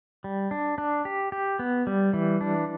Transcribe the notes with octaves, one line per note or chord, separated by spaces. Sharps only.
G3
D4
D4
G4
G4
B3
G3
E3
D4